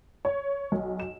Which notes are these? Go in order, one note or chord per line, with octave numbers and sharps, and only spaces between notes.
C#5
B1
E7